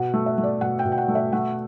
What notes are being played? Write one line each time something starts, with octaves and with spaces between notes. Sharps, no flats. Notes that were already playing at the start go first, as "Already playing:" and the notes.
Already playing: B2 F#5
A3
E5
A3
D5
B2 F#5
G5
B2
G5
F#5
A3
E5
A3 F#5